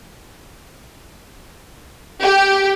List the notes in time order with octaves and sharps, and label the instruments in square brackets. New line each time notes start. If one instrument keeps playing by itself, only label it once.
[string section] G4